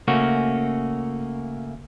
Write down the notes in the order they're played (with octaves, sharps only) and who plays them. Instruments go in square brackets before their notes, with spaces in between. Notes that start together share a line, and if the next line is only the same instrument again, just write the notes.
[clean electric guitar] C#3 A3 A#3 C#4 F#4